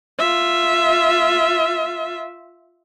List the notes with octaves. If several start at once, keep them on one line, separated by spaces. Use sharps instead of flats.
F4 E5